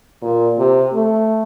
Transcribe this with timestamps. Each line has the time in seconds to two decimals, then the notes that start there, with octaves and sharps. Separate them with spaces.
0.22 A#2
0.58 C3
0.94 A3